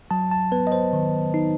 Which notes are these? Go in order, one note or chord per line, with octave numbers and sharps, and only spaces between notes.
F#3 A5
A5
B3 B4
D#5
C5
D#3
D#4